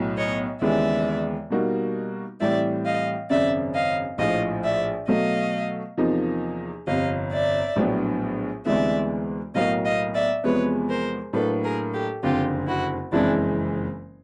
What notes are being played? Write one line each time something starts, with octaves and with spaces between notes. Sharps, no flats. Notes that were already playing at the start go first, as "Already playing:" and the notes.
Already playing: B1 A2 F#3
C#5 D#5
D#2 C#3 E3 G#3 B3 D5 E5
B2 G3 A#3 D#4 F#4
A2 E3 G3 C4 D5 E5
D#5 F5
G#1 F#2 C#3 D5 E5
D#5 F5
A#1 A2 F3 D#5 F5
D5 E5
B2 F#3 A3 D#5 F5
E2 C3 F3 A#3 D#4
G1 F2 C3 D#5 F5
D5 E5
A#1 A2 F#3 B3 D4
D2 C3 E3 G#3 B3 D5 E5
B1 A2 F#3 A#3 D#5 F5
D#5 F5
D5 E5
E2 C3 F3 G#3 B3 B4 C#5
A#4 C5
A2 F#3 A#3 D4 A4 B4
G#4 A#4
G4 A4
F#1 F2 D3 F4 G4
E4 F#4
F#1 F2 C#3 E3 G#3 D4 E4